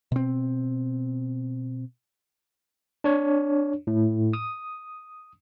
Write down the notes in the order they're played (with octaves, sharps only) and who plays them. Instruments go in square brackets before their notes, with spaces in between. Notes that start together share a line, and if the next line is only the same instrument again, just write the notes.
[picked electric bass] B2 C4
[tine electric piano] D4 C#5
A2
D#6